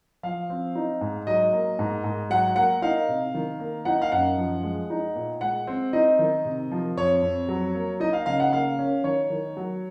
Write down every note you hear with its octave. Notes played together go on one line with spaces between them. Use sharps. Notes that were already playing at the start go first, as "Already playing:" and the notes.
F3 F5
C4
D#4
G#2
F#3 D#5
A#3
G#2
G#2
F#3 F#5
A#3 F#5
D#4 F5
C3
D#3
A#3
D#4 F#5
F5
F#2 F#5
F3
G#3
D#4
A#2
G#3 F#5
C4
D#4 D#5
D#3
C3
F3
F2 C#5
F2
F#3
A#3
D#4 D#5
F5
C#3 F5
F#5
A#3 F5
C#4
D#3 C#5
D#3
F#3